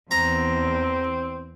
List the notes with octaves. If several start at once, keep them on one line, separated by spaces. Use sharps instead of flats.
E2 C4 A#5